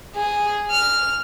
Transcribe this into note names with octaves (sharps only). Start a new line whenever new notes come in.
G#4
F6